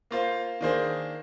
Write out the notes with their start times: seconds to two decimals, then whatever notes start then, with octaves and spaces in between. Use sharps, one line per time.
0.11 A#3 F4 C5 F5
0.61 D#3 A#3 D4 G#4 C5